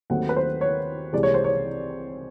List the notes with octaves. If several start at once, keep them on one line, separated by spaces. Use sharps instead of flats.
D#2 D#3 F#3 A3 C4 F#5
B4
C5
C#5
C2 C3 E3 G#3 D5
C#5
C5
C#5